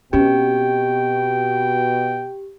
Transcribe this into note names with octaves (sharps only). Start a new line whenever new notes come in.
B2 C4 C#4 G4 G5